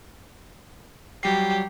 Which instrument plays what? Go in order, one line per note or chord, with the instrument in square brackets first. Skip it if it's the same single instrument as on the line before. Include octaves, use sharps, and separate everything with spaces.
[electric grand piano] F#3 G3 C7 [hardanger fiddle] G4